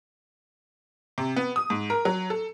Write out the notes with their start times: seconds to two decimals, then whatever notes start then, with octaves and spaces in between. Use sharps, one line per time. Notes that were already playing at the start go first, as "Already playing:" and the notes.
1.18 C3
1.36 B3
1.56 D#6
1.70 G#2
1.90 A#4
2.05 F#3
2.30 A4